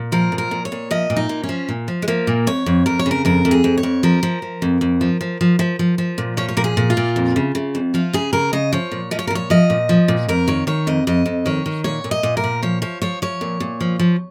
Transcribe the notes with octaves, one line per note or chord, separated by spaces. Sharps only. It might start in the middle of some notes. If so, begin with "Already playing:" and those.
Already playing: A#2
F3 A#4
A#2
A#4
A#2
C#5
A#2
F3 D#5
A#2
D#4
A#2
C#4
F3
A#2
F3
G#3
F3 A#3
A#2
F2 C#5
F2
F2 A#4
C#5
C#3
A#4
F2 A#4
F2
G#4
F2
C#5
F2
F3 A#4
F3
F3
F2
F2
F3
F3
F3
F3
F3
F3
A#2
F3 C#5
C#5
A#2 A#4
G#4
A#2
F4
A#2
F2
C#3
C#3
F2
F3 F4
C#3 G#4
C#3 A#4
C#3 D#5
F3 C#5
A#2
F3 D#5
C#5
A#4
A#2 C#5
F3 D#5
A#2
F3
A#2
F2 A#4
D#3 C#5
D#3 C#5
F2 D#5
F2 D#5
F2
D#3 C#5
D#3
A#2 C#5
A#2
D#5
A#2
A#4
A#2
F3 C#5
F3 C#5
F3 C#5
F3 C#5
A#2
A#2
F3
F3